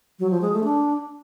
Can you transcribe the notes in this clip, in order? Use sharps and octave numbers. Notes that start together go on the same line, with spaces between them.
F#3
F3
G#3
A3
D4